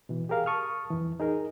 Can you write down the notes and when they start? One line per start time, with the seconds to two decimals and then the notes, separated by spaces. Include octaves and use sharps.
0.09 B2 E3
0.29 G4 G#4 A#4 F5
0.46 A5 C#6 D#6 F6
0.91 F2 E3
1.20 D#4 G#4 A#4